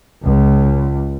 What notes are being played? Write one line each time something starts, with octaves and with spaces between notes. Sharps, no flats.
C#2